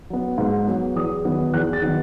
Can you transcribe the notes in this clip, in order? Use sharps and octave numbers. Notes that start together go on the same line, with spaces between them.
F#3 B3
G#2
F#3 B3
E2 D#6
D#3 F#3 B3
E2 F#6
A6
D#3 F#3 B3